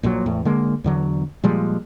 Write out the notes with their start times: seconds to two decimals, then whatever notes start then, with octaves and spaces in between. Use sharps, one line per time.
0.03 A#1 A#2 E3 F#3
0.26 E2 A2
0.45 D3 G#3 A#3
0.84 E2 D3 F#3
1.44 A#2 F3 G3 G#3